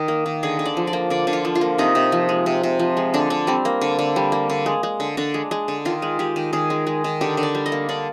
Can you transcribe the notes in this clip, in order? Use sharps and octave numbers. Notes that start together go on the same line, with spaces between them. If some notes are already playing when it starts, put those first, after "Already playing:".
Already playing: D#3
A#3
D#3
D3 G#4
D3
D5
F3
D5
A#3
D3 D5
D3
F4
F3
F4
A#3
C3 D#4
C3
F3
G#3
C3
C3
F3
G#3
D3 D4
D3
G3 C4
A#3
D3
D3
G3
A#3
D3
G#3
G#3
D3
D3 D4
G#3
G#3
D3
D#3 F4
G#3
G#3 G4
D#3
D#3 G#4
G#3
G#3
D#3
D3 G4
D3
D5
G3
D#5
A#3
D3 D5